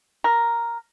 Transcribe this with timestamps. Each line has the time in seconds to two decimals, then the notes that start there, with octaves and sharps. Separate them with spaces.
0.24 A#4